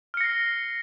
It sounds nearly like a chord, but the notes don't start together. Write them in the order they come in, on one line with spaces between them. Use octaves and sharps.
F6 C#7 A#6 C7